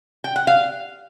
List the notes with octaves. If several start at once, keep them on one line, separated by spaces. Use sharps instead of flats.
G5
F#5
F5